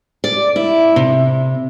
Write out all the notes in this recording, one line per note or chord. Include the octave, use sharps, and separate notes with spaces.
D5
E4
C3